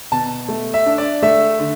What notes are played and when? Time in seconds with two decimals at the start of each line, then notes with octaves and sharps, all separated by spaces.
0.12 B2 A5
0.48 A3
0.74 E5
0.86 D4
0.98 D5
1.22 A3 E5
1.59 D3